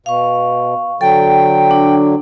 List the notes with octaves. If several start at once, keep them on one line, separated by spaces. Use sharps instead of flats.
B2 F5 C#6
D3 F#3 A4 G5
D4